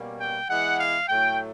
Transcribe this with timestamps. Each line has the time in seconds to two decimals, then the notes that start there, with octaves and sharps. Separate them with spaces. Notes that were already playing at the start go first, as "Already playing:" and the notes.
Already playing: B2 G3 A#3 C#4
0.20 G5
0.49 E3 G#3 B3 F#5
0.79 F5
1.08 A2 F#3 A3 G5